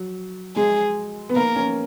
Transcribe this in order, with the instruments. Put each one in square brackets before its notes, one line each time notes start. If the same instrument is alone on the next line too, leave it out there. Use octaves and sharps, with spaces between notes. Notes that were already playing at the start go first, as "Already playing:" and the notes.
Already playing: [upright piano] F#3
[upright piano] G#3 [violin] G#4
[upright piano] B3
[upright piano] A#3 [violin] A#4
[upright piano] C#4